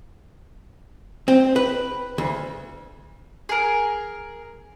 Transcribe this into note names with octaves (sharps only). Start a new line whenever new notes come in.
C4
B4
D2
G#4 A#4